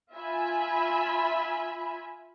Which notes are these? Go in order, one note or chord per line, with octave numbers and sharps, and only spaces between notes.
F4 E5 G#5 B5